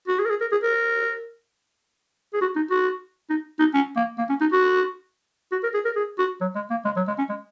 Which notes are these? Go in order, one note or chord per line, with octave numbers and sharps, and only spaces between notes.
F#4
G#4
A#4
G#4
A#4
G#4
A#4
G#4
F#4
D#4
F#4
D#4
D#4
C#4
A#3
A#3
C#4
D#4
F#4
F#4
A#4
G#4
A#4
G#4
F#4
F#3
G#3
A#3
G#3
F#3
G#3
C#4
G#3